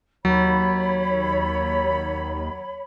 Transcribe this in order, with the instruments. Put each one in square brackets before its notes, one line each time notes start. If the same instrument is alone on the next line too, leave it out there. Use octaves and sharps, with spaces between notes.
[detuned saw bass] D#2 [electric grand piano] F#3 [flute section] C#5 B5